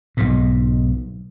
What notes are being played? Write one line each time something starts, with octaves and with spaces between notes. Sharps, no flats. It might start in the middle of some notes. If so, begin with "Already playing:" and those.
B1 G#2